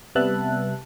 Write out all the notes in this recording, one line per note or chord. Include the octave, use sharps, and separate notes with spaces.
C3 G3 B3 E5 A5 F#6